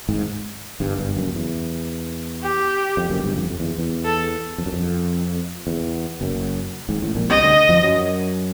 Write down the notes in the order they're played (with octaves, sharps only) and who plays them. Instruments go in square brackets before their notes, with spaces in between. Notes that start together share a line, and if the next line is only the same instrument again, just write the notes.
[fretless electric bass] G#1 G#2
G1 G2
G1 G2
F#1 F#2
E2
[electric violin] G4
[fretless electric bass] F2
F#1 F#2
G1 G2
F2
F2
E2
E2
[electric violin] A4
[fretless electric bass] F2
F#2
F2
E2
F#1 F#2
G#1 G#2
A1 A2
A#1 A#2
[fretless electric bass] C2 C3 [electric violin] D#5
[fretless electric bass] D2 D3
F2 F3
F#2 F#3